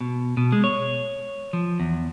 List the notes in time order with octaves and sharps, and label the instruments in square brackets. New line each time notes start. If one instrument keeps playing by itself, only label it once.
[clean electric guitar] B2
B2
G#3
C#5
F3
E2